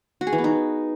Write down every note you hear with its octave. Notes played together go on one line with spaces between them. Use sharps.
F#4
G#4
E3
B3
D#4